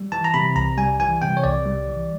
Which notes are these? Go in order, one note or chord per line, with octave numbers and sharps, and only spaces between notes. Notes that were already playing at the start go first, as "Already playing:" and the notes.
Already playing: G3
E3 A5
A#5
C3 B5
C2 A#5
G3 G#5
E3 G#5
C3 G5
C#5
C2 D5
G3
E3